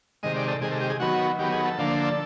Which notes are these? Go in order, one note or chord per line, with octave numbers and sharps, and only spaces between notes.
C3 D#3 G#3 D#5
D5
A4
C3 D#3 G#3 G#4
A4
G4
G#4
D#3 F#3 B3 F#4
D#3 F#3 B3 G4
G#4
A4
D3 F3 A#3 D4